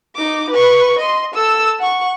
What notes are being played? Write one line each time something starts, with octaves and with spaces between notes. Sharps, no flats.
D#4 D6
B4 C#6
D#5 C6
A4 E6
F#5 C#6